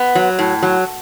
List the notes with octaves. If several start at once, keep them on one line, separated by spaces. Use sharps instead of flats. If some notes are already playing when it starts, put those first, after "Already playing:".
Already playing: B3
F#3
A2
F#3